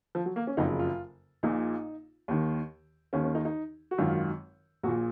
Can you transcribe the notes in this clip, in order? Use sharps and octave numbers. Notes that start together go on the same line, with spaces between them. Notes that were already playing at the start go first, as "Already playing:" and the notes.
F3
F#3
A#3
C#4
F#1 F2 C#3 D#4
F4
A#1 A#2 D#4
D#2 D#3
D#2 D#3 C#4
C#4
D#4
D#4
F#4
G#1 F#2 D#3 F4
A#1 A#2 F#4